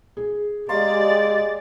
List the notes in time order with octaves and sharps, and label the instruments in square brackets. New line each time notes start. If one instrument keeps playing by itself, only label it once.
[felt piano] G#4
[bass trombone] G#3 [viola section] G4 G#4 D5 [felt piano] F5 A#5 C6 [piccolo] A6